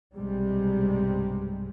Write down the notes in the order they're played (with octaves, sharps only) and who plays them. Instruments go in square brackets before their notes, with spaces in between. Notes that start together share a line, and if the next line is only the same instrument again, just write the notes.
[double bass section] B1 G2 C3 G3 G#3